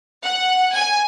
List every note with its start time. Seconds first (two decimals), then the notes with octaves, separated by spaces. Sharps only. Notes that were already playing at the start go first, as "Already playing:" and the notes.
0.24 F#5
0.76 G#5